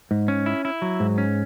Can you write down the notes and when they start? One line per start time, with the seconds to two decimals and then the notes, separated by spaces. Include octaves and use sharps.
0.11 G#2
0.28 C#4
0.46 E4
0.65 E4
0.82 F#3
1.00 G#2
1.18 C#4